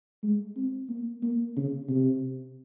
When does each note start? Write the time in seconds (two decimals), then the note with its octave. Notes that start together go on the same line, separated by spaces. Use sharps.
0.23 G#3
0.56 C4
0.89 A#3
1.22 A#3
1.57 C#3
1.89 C3